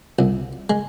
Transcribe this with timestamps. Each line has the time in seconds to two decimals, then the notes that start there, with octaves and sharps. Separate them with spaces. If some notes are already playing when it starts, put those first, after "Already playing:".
0.19 C2
0.70 G#3